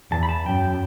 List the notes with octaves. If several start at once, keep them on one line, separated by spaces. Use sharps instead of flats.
E2 A5
B5
A5
F#2 G5